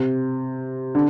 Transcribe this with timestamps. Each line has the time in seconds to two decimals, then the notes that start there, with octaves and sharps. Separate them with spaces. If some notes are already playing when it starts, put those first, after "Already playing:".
Already playing: C3
0.95 D3